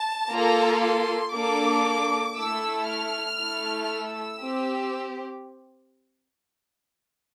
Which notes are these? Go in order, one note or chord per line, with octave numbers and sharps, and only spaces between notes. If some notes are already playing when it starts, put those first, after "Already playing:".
Already playing: A5
A#3 F4 A4 A#5
C6
A#3 D4 A4 D6
A3 E4 A4 E6
F6
A3 E4 A4
E6
C4 G4